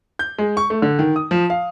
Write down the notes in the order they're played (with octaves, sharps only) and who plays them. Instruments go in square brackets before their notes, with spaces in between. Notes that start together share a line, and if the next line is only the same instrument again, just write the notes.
[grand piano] G6
G#3
C#6
A3
D3
D#3
D#6
F3
F5